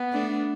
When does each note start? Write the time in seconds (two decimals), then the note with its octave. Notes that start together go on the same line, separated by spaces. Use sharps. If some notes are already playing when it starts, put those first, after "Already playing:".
Already playing: B3
0.12 A3 D4